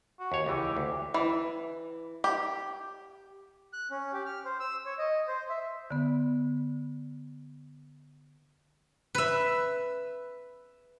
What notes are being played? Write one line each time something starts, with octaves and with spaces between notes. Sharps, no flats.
F#4
D#2 C#5
C#2 E3 G4
D2
E3
G4
F#6
C#4
G4
F6
C5
E6
C#5
D#5
C5
E5
D3 B3
B4 E5